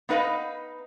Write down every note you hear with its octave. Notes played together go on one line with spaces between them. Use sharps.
B3 D#4 B4 D#5 F5